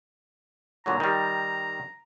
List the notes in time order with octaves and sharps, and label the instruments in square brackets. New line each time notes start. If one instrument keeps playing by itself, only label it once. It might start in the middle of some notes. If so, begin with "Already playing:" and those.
[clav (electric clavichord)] A#2 D3 F#3 [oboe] A#5
[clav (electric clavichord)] D#3 G3